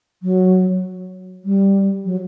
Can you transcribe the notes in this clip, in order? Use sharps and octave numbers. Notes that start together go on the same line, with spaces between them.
F#3
G3
F#3